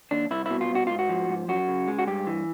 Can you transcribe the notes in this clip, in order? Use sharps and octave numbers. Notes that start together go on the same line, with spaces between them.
D#2 D4
C2 E4
B2 E4
F4
C2
F#4
G#2 F4
F#4
F3
G#2
F#2 F#4
C#3
G#3
F#4
G2 G4
E3